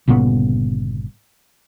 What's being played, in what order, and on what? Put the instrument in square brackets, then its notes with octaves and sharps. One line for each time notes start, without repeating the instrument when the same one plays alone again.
[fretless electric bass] G1 A#2 C#3 B3